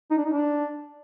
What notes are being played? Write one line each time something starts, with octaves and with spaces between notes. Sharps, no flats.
D#4
D4
D#4
D4